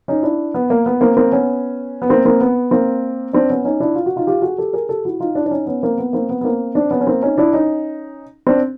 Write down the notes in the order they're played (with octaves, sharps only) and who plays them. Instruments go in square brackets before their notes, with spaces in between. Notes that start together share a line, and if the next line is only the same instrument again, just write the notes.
[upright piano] C#4 D#4
D4 E4
B3
A#3
B3
A#3 C4
A#3 C4
B3 C#4
B3
A#3 C4
A#3 C4
B3
A#3 C4
C4 D4
B3 C#4
C#4 D#4
D4 E4
F4
F#4
D#4 F4
F4 G4
F#4 G#4
G4 A4
G#4 A#4
G4 A4
E4 F#4
D#4 F4
D4 E4
D4
C#4 D#4
B3 C#4
A#3 C4
B3
A#3 C4
B3
B3
A#3 C4
C4 D4
B3 C#4
C#4
A#3 C4
C#4 D#4
D4 E4
C#4 D#4
C4 D4